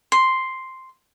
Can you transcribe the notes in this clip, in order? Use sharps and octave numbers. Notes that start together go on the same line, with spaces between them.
C6